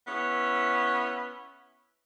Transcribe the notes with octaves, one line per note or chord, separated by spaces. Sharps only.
B3 C#4 E4